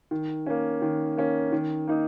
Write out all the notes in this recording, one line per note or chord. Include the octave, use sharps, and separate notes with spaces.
D#3
A#3 C#4
D#3
A#3 C#4
D#3
A#3 D#4